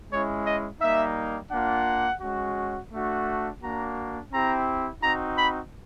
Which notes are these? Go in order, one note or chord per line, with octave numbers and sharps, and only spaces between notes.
G#3 C#4 E4 C#5
D#5
G3 A#3 D#4 E5
A#3 D4 F4 F#5
G#3 C#4 F#4
A3 D4 F#4
A#3 D4 F#4 A#5
C4 E4 G4 A#5
C4 D#4 F#4 A#5
B5